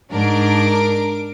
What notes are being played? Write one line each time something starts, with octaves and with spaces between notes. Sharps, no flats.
G#2 D4 A#4 D7